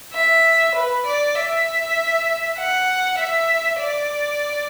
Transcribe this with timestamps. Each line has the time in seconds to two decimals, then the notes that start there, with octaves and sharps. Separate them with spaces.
0.14 E5
0.75 B4
1.06 D5
1.35 E5
2.58 F#5
3.18 E5
3.79 D5